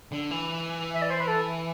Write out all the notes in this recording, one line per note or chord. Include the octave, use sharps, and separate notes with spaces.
D3
E3
E5
D5
C5
B4
A4